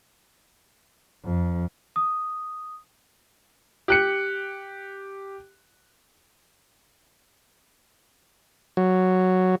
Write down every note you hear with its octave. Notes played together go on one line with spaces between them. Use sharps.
F2
D#6
G4 F#6 C#7
F#3